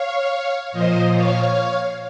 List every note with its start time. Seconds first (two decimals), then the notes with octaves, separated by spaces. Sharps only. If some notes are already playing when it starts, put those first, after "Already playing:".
Already playing: C#5 F5
0.72 A#2 F3 C5 D#5
1.14 C#5 F5